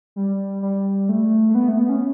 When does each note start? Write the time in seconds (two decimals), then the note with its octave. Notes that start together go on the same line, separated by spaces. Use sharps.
0.16 G3
0.62 G3
1.09 A3
1.49 A3
1.55 B3
1.68 A3
1.79 B3
1.89 C#4